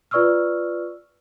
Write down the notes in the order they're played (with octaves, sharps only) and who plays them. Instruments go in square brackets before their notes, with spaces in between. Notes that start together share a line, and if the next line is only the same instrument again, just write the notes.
[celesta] F4 B4 D5 C#6 E6 F6